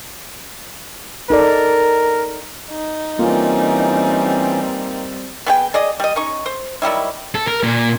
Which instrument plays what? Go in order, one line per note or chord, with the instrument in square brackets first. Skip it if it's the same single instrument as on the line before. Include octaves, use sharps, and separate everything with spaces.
[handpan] D#4 A4 D5 [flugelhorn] A#4
[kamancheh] D#4
[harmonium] E3 C#4 [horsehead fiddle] G3 C4 [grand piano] A#3 F4
[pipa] B3 G#4 G5
G#4 D5 D#5
G3 D#5
C#4 D#4 C#6
C5
D#3 F#3 G3 E4
[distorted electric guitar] A4
A#4
A#2